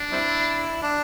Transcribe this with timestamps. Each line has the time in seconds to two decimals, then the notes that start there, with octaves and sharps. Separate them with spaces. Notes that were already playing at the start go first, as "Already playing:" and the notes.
Already playing: D4
0.12 G3 C4 E4
0.82 D4